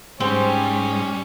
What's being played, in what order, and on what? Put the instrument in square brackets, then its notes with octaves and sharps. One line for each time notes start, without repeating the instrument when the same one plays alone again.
[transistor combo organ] G#2 [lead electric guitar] G3 [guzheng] C4 [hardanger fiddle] C#4